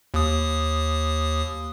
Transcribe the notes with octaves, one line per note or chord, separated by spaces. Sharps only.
D#2 D#6